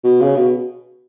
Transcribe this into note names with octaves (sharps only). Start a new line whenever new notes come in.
B2
C#3
B2